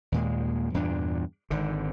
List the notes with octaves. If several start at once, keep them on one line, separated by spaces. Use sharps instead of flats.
D#2 A#2 G#3
E2 G2 A#2 D4
G#1 G#2 D3